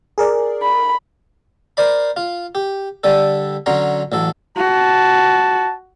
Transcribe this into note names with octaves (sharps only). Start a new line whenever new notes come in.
G#4 A#4 D5
B5
A#4 C5 D5 B5
F4
G4
D3 G3 A4
D3 F#3 C#4 A#5 C6
A1 F#3 A4
F#4 A5